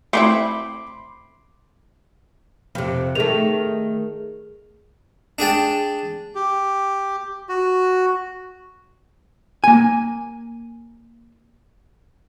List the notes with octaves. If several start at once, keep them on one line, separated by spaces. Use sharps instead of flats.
A3 C4 E4 B5 C6 D6
F2 C3
D#3 A3 G#4 F7
D4 G#4 G5 A5
G4
F#4
A#3 G#5